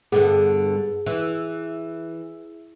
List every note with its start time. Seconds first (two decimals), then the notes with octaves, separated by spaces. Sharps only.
0.12 G2 D3 B3 G#4
1.06 E3